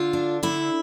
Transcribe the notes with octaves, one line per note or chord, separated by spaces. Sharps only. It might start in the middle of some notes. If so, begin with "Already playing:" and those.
Already playing: D3 F4
D4
D3 E4